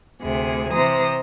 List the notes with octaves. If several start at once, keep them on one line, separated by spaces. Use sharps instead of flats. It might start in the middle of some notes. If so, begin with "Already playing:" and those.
D2 C3 G#4
C3 E3 C5 A#5 D#6